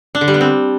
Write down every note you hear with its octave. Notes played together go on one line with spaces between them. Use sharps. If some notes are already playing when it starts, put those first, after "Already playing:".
D4
D3
G3
B3
C4